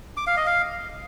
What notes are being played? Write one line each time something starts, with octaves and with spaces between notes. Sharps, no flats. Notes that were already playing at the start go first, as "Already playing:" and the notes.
D6
F5
D#5
F5